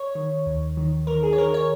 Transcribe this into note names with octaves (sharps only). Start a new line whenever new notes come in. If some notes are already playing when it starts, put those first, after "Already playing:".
Already playing: C#5
D#3
D#2
D#3
D#3 A#4
G#4
C#5
D#3 A#4
C#5